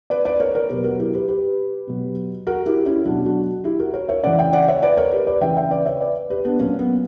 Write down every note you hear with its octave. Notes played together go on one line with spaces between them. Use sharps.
B4 D5
B4 D5
A#4 C#5
A#4 C#5
B2 F#3 G4 B4
F#4 A#4
E4 G4
G4 B4
G4 B4
B2 F#3
F#4 A#4
E4 G4
C#4 E4
B2 F#3 D4 F#4
D4 F#4
E4 G4
F#4 A#4
A#4 C#5
C#5 E5
C#3 E3 D5 F#5
E5 G5
D5 F#5
C#5 E5
B4 D5
A#4 C#5
G4 B4
B4 D5
C#3 E3 E5 G5
E5 G5
B4 D5
C#5 E5
B4 D5
G4 B4
B3 D4
A#2 F#3 A#3 C#4
B3